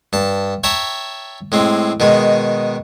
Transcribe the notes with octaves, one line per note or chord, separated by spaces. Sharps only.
G2 A5
C#5 E5 G5 A5 A#5
A2 G#3 C4
B2 D#3 G#3